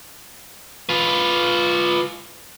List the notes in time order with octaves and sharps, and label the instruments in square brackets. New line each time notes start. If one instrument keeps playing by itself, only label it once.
[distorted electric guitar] F4 B4